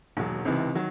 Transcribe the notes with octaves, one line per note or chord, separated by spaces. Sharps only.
E1 D#2 D#3 F#3
C#2 C3 E3 C4 D#4
D#3 F#3